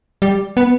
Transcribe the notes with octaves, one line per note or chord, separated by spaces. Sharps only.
G3
B3